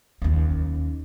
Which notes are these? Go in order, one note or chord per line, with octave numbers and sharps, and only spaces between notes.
D#2 C#4